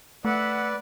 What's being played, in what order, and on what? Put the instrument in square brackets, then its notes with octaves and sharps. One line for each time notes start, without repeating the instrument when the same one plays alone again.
[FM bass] A3 [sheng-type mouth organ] B4 D5 [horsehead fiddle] E5 F#5